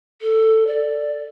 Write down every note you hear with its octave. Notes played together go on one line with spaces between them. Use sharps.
A4
D5